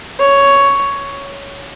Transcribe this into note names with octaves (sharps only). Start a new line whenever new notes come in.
C#5